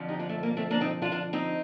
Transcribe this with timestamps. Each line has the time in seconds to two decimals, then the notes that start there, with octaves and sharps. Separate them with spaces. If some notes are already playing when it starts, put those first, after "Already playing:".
Already playing: F2 D3 F3
0.08 D#4 G4
0.19 D4 F4
0.29 A3
0.43 A#3
0.57 A3 C4
0.70 A#3 D4
0.81 C4 D#4
1.02 D4 F4
1.12 D4 F4
1.33 C4 D#4